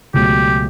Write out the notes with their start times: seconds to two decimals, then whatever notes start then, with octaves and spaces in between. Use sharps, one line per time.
0.14 C#2 B2 F#3 A3 G4